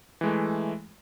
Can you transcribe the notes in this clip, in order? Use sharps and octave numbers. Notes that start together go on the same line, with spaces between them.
E3 G#3 A3